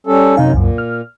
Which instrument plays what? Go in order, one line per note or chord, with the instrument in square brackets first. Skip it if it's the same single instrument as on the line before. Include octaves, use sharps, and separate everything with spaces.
[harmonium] G3 C#4 A4
[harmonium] F#2 D#4 [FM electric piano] C3 F5 G#5
[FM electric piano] C2 F#2 [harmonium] A#2
[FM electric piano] F6